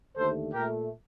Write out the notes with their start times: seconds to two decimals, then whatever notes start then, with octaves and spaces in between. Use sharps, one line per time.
0.16 D#2 D3 A3 A4 C5
0.53 A#2 A3 G4 A#4